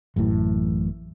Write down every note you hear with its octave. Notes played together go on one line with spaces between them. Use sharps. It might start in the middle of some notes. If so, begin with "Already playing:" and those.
A1 F#2 A2 E3